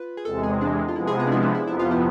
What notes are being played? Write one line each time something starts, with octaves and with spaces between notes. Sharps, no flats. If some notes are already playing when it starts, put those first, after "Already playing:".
Already playing: F4 B4
G#4
E2 C3 G#3 A4
G#4
D4
F4
C3 F3 G#3 B3 E4
G#4
G#4
D4
E4
D4
E4
F2 C3 F3 B3 E4
F4
E4